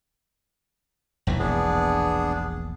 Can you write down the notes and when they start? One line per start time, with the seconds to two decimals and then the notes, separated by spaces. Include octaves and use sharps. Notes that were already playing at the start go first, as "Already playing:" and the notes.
1.27 E1 A#1 E3
1.39 B3 D4 G#4